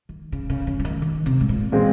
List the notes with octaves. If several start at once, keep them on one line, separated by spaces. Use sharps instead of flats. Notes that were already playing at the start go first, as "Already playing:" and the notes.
D#3
C#3
C#3
C#3
F3
D#3
D#3
C3
G#2
A#2
A#2 G#3 C4